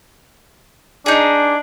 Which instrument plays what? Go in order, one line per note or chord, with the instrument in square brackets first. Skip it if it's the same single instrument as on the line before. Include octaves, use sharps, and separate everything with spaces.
[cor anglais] D4 [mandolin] D#4 G#4